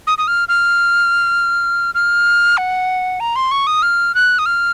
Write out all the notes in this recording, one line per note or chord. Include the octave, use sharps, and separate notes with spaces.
D#6
D#6
F6
F6
F6
F#5
A#5
C6
C#6
D#6
F6
F#6
D#6
F6